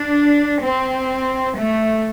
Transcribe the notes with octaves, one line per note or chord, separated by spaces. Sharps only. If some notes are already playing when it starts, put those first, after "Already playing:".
Already playing: D4
C4
A3